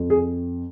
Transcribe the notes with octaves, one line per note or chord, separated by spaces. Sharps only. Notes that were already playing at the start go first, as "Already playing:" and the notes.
Already playing: F2
G#4